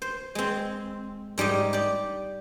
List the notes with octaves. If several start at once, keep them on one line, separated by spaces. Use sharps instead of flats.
C5
G#3 C4
G#2 G3 G4 D#5
G4 D5